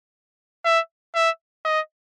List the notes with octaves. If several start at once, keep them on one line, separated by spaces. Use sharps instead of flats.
E5
E5
D#5